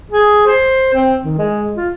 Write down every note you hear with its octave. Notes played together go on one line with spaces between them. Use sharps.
G#4
C5
C4
D#3
G#3
F4